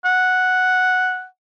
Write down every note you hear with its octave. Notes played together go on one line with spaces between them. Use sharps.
F#5